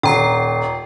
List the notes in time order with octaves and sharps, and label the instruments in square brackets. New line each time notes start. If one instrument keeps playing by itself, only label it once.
[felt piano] D#1 [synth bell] G5 A#5 C7